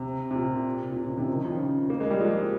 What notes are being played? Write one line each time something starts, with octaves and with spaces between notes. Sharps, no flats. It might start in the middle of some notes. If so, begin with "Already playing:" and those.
Already playing: C3
C3
A#2
A#2
C3
A#2 C#3
C3 D#3
F3
D#3
C#3 F3
A#3
G#3
G3
F3 G#3